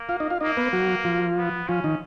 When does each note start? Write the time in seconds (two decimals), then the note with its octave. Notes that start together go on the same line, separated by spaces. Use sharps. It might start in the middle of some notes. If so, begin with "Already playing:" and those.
Already playing: A#3
0.09 F4 F5
0.20 D#4 D#5
0.30 F4 F5
0.40 A#3 D#4 D#5
0.57 B3 B4
0.73 F#3 F#4
1.04 F3 F4
1.37 B3
1.68 F3 C#4 F4
1.84 D#3 D#4